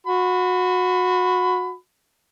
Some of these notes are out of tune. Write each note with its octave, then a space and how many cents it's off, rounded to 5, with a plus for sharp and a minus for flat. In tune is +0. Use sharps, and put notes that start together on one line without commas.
F#4 -25 B5 +20